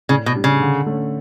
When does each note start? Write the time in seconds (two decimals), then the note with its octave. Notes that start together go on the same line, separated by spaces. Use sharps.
0.09 A2 C#3
0.26 B2
0.35 G3 D4
0.44 C#3
0.61 D3
0.86 A3 C#4